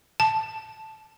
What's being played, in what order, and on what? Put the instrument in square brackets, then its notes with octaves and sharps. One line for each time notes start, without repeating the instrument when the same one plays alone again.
[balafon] A5